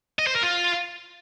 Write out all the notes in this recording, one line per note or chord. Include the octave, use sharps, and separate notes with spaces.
D#5
C5
A#4
F4